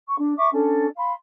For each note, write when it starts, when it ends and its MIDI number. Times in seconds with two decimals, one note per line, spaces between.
0.07 0.17 85
0.19 0.32 62
0.37 0.48 76
0.37 0.48 85
0.37 0.48 86
0.52 0.86 61
0.52 0.86 62
0.52 0.86 69
0.96 1.11 77
0.96 1.11 83
0.96 1.11 84